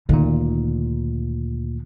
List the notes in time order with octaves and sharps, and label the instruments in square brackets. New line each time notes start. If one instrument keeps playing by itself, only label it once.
[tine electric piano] D2 A#2 [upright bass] D#3 E3